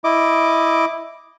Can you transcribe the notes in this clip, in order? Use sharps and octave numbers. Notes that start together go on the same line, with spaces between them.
E4 D#5 D6